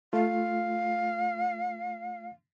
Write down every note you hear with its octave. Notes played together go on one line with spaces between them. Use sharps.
A3 F4 F5